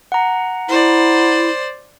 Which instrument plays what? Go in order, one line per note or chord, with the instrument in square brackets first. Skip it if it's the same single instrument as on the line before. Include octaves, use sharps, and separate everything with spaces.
[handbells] F#5 A#5
[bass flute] E4 [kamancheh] C5 D5